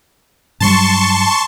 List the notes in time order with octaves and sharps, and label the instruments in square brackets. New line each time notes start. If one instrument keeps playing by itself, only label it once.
[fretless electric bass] G2 F#3 G3 [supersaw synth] A5 C6 C#6